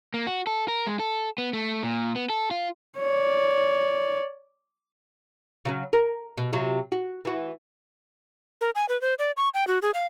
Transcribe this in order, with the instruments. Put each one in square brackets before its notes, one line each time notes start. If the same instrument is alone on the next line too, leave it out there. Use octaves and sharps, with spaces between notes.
[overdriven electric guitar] A#3
F#4
A4
A#4
G#3
A4
B3
A3
A#2
B3
A4
F4
[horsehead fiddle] C#5 D5
[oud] C#3 F#3 C#4
A#4
B2
C3 F#3 F4
F#4
E3 F#4
[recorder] A#4
G#5
B4
C5
D5
C#6
G5
F#4
G#4
F5